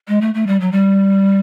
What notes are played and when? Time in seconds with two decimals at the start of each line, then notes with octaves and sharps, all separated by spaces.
0.08 G#3
0.21 A3
0.34 A3
0.47 G3
0.60 F#3
0.72 G3